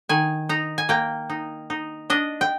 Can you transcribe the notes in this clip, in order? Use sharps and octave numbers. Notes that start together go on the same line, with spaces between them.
D#3 G#5
D#4 A#5
G#5
A#3 G5
D#4
D#4
D4 D#5
G5